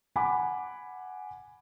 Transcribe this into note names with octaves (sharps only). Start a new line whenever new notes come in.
F#5 G#5 B5 D6